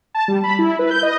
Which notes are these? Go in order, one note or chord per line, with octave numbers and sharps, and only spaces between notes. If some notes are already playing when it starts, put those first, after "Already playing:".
A5
G3
B5
E4
B4
G6
D#5